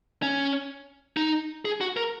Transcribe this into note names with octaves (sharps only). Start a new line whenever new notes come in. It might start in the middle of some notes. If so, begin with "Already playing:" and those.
C#4
D#4
G#4
F#4
A#4